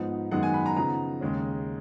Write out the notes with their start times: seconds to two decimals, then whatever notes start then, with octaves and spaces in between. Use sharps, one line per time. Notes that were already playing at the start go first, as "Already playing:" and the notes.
Already playing: G#2 F3 B3 D#4
0.31 F#2 D#3 G#3 B3 D#4 F#5
0.43 G#5
0.54 B5
0.66 A#5
0.77 C#3 F3 B3 D#4 A#5
1.21 D#2 C#3 G#3 C#4